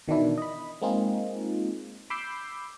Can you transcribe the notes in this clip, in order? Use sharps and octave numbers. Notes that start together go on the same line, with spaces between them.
B2 D#3 E3 D4 E4
D#5 B5
G#3 A#3 C4 D#4 F4 G#4
B5 D6 E6 G6 C7